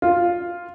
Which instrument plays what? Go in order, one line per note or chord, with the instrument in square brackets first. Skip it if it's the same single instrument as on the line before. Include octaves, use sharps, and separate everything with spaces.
[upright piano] F4